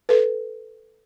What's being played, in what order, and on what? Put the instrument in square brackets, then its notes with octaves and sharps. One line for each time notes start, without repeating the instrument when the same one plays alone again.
[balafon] A4 B4